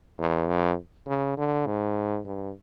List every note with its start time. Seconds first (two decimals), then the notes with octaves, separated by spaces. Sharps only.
0.18 E2
0.48 F2
1.07 C#3
1.37 D3
1.67 G#2
2.26 G2